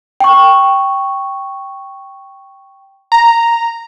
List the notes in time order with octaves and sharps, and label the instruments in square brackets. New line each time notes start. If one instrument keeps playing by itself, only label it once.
[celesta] G5 C#6
[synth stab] A#5